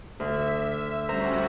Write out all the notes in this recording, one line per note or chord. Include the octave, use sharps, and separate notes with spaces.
D2 E5
G3 C#4 F#4 C5 E5 A#5